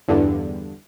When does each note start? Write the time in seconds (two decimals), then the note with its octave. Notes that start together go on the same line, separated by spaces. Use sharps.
0.08 E2 G2 D3